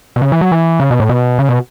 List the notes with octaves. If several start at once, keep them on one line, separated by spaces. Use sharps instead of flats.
B2
C#3
E3
F#3
E3
C#3
B2
A2
B2
C#3
B2